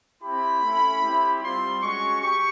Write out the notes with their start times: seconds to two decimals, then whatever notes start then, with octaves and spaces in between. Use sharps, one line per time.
0.22 C4 E4 G4 B5
0.61 A3 C#4 E4
1.01 C4 E4 G4
1.41 G3 C4 F4 C6
1.81 G#3 C#4 F#4 C#6
2.21 G4 C#6